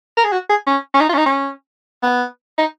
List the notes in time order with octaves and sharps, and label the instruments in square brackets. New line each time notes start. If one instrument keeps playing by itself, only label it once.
[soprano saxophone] A#4
G#4
F#4
G#4
C#4
C#4
D#4
F4
C#4
D#4
C#4
B3
D#4